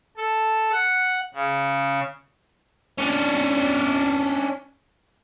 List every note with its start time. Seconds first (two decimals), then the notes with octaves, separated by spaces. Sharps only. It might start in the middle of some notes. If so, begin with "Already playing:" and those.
0.17 A4
0.72 F#5
1.34 C#3
2.98 C#4 D4